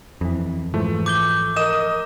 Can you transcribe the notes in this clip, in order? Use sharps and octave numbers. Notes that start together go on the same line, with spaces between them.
F2 E3
G#2 E3 F3 A3
D6 G6 G7
A#4 D#5 D#6 E7